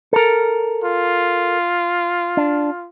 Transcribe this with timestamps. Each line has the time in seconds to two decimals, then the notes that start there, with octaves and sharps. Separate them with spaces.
0.13 A4 A#4
0.84 F4
2.37 D4